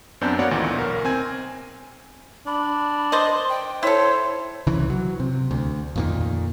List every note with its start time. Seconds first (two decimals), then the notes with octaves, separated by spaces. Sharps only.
0.21 F#2 B3 C4 D4 G6
0.39 A#3 B3 F#4 C#5 D5 F#5
0.51 D2 A#2 D#3 E3
0.75 B1 A#4
1.05 C4 G#5 G#6
2.47 D4 B5
3.12 C5 D5 D#5 C6
3.49 G5
3.83 E4 A4 C5 C#5
4.67 C2 C#3 E3
4.90 F#3
5.20 C3
5.51 D2
5.96 F2 A#2 D#3